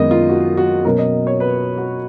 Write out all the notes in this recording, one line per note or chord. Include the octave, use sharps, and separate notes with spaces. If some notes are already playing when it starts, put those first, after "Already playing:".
Already playing: F#2 D#3 G#3 B3 D#5
F4
F#4
F#4
B2 F#3 A#3 C#4 A#4
D#5
C#5
B4
F#4